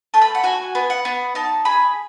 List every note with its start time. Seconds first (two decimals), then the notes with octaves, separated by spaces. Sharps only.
0.14 A3 A5
0.22 B5
0.35 F#5
0.44 F#4 G#5
0.75 B3
0.90 F#5
1.05 B3
1.35 D#4 A5
1.65 G#4 B5